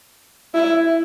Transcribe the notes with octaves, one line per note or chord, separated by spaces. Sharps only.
E4